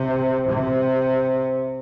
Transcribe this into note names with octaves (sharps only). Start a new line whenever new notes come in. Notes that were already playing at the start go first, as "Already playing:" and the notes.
Already playing: C3
C3